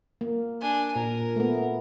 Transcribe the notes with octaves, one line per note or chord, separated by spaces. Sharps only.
A#3
D4 G#5
A#2 A#4
A3 B3